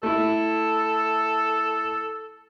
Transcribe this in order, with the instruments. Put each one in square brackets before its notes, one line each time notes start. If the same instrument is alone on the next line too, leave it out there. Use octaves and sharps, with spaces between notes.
[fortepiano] A3 E4 [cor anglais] A4